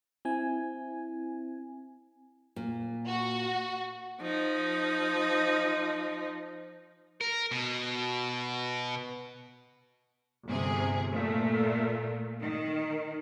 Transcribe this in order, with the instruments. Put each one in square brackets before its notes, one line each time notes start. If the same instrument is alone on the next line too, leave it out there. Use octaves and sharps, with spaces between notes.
[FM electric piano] C4 E4 G#5
[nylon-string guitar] A#2
[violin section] F#4
[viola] F3 D#4
[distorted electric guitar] A#4
B2
[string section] G1 C3 G#4
A#2 A3
D#3